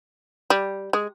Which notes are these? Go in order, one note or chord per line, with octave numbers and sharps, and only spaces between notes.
G3
G#3